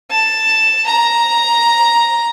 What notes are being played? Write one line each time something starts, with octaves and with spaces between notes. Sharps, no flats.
A5
A#5